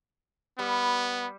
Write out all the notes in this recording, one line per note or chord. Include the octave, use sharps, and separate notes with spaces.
G3 B3